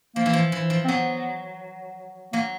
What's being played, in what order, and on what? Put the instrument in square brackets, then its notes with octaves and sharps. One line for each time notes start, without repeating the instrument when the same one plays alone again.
[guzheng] F3 [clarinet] A#3
[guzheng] E3
F3
E3
F3
[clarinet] C4
[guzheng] F#3 [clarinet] B3
[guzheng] F#3 [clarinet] A#3